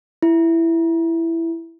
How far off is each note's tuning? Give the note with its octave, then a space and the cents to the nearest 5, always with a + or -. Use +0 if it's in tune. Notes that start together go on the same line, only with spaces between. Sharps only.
E4 +5